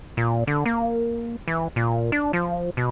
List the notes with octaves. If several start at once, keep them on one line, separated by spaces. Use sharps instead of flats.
A#2
D3
A#3
E3
A#2
D4
F3
B2